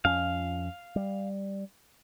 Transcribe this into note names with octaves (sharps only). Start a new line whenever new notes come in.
F2 F3 C#4 F5
G3